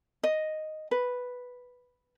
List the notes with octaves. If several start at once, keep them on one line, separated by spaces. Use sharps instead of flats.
D#5
B4